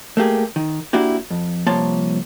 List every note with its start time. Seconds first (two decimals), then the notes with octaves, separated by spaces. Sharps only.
0.17 A3 A#3 G4 G#4
0.56 D#3
0.93 A#3 D4 E4 F#4 G4
1.30 F2
1.67 C2 F3 A#3 C#5 A5 C6